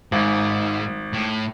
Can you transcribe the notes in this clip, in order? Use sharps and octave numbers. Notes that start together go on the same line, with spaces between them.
G#1 G#2
A2